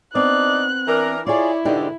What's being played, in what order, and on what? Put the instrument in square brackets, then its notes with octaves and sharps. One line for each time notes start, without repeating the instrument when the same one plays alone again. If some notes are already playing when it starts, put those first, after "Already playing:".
[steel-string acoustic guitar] B3 C4 [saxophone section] D4 D#4 D5 [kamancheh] F#6
[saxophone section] E3 D4 A#4
[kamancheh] E4 [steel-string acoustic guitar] F4 G#4 [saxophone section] C#5 D5
[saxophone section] G#2 B2 D3 [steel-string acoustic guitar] D4 D#4 G4